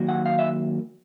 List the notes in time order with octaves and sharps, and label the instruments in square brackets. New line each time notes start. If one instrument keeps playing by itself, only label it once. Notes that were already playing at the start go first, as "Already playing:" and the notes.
Already playing: [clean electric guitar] D#3 F#3 A#3
F#5
F5
E5